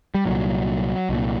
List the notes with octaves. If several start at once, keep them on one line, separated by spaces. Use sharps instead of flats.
G3
C2 A#2 F#3
C2 A#2